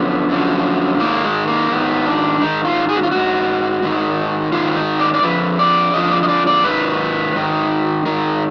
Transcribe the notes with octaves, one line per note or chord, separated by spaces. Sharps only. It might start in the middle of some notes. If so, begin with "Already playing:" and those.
Already playing: F#2 D3 F3 B3
F#2 D3 F3
G#2 D#3 A#3
G#3
A#3
G#2 D#3 B3
D4
G#2 D#3 D#4
F4
G#4
F#4
F4
G#2 D#3 F#4
G#2 D#3
G#2 D#3 F4
D#4
D5
D5
F2 D3 F3 B4
D5
F2 D3 F3 D#5
D5
D#5
D5
D5
G#2 D#3 B4
G#2 D#3
G#2 D#3 A#4